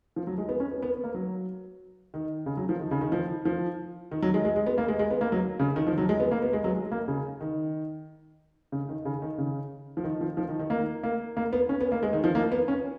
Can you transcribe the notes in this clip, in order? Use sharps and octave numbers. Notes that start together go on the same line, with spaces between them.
F3
F#3
G#3
B3
C#4
B3
B3
B3
A#3
F#3
D#3
C#3
F#3
F3
D#3
C#3
D#3
F3
F3
D#3
F#3
G#3
G#3
G#3
B3
A#3
G#3
G#3
B3
A#3
F#3
C#3
D#3
F3
F#3
G#3
B3
A#3
B3
G#3
F#3
G#3
A#3
C#3
D#3
C#3
D#3
C#3
D#3
C#3
F3
D#3
F3
F3
D#3
D#3
A#3
A#3
A#3
B3
C#4
B3
A#3
G#3
D#3
F3
A#3
B3
C#4